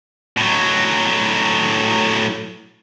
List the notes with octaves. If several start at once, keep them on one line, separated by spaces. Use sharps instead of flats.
A2 F#3